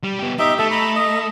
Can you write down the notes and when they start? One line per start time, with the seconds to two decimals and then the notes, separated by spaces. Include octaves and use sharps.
0.04 G3
0.19 B3 G4
0.39 D#4 G4 E5
0.59 A3 A4 E5
0.71 A#5 B5
0.96 D#5